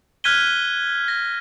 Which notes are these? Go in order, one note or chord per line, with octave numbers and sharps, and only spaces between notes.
F6 F#6 G#6 B6 D#7 G7
A#6